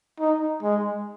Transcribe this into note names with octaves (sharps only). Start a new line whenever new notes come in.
D#4
G#3